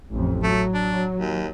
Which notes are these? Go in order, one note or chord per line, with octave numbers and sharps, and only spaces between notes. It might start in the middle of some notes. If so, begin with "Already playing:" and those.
A1 F2
F#3 A3
D4
D#2